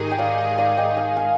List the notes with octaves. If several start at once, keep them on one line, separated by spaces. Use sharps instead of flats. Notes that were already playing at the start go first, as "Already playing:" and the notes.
Already playing: G#2 D#3 G#3 D#4 G4 G#4 A#4
G5
D5 F5
D5 F5
D#5 G5
F5 G#5
F5 G#5